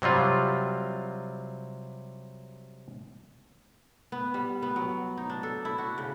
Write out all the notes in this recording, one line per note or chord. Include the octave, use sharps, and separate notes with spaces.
C3 F#3 G3 F4
B3
G3
B3
F#3
D#4
D4
A4
E4
F#4
C#3